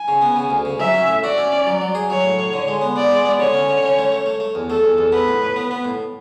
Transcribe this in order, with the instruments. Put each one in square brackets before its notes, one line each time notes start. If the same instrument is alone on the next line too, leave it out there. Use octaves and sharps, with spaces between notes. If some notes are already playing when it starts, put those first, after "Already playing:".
Already playing: [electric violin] G#5
[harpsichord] C#3
B3
C#3
D2
C#3
[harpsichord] F#3 [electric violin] E5
[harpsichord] C#4
A2
[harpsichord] F#4 [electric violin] D5
[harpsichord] C#4
C#4
F#3
F#3
G#4
[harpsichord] F#3 [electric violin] C#5
[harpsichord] A2
A2
D3
G#3
B3
[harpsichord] B3 [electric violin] D5
[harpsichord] G#3
B3
[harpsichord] D3 [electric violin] C#5
[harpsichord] C#4
D3
C#4
A3
A3
A3
A3
E2
[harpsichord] A3 [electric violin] A4
[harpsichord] E2
E2
[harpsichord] B3 [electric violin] B4
[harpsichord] A2
A2
B3
B3
A2